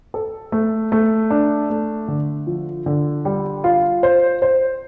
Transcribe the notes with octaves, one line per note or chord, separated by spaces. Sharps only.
A4
A3
A3
D4
A3
D3
F3
D3
G3
F4
C5
C5